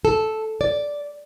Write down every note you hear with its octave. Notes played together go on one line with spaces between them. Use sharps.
A4
D5